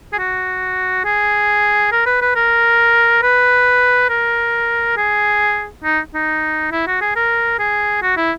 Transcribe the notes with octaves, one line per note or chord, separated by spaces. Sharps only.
G#4
F#4
G#4
A#4
B4
B4
A#4
B4
A#4
G#4
D#4
D#4
E4
F#4
G#4
A#4
G#4
F#4
E4